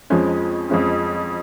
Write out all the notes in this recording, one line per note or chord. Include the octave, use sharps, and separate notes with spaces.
F2 F3 G#3 C#4
F2 F3 G#3 C#4